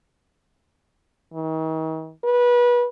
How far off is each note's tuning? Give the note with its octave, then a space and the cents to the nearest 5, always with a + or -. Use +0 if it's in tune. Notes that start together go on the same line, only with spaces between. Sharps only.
D#3 +40
B4 -25